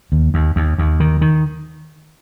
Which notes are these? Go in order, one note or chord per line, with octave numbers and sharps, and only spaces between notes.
D#2
D#2
D#2
D#2
D#3
D#3